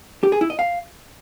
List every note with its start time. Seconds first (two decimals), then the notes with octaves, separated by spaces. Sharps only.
0.23 G4
0.32 G#4
0.41 E4
0.50 D#5
0.59 F5